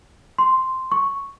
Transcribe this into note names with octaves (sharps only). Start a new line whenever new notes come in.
C6
C#6